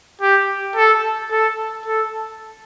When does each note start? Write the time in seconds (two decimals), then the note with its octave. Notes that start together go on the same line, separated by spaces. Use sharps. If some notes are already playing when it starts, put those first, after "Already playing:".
0.21 G4
0.76 A4
1.31 A4
1.86 A4